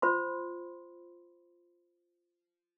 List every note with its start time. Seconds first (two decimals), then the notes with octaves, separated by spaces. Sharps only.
0.02 F4 C5 B5 C6